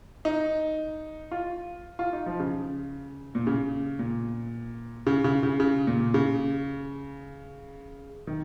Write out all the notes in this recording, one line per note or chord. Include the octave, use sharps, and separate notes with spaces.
D#4
F4
F4
D#4
F3
C#3
A#2
C#3
A#2
C#3
C#3
C#3
C#3
A#2
C#3
D#3